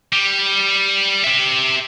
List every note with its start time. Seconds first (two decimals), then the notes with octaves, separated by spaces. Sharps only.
0.13 G3
1.24 G4 E5